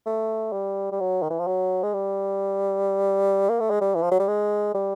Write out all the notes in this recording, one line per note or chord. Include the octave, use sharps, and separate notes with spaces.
A3
G3
G3
F#3
D#3
E3
F3
F#3
G#3
G3
A#3
A3
G#3
G3
E3
F3
F#3
G3
G#3
G3